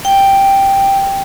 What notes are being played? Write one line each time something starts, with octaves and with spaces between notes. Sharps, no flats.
G5